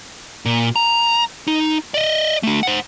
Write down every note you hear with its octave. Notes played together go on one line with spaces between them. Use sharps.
A#2
A#5
D#4
D5 D#5
D3 A3
C5 F#5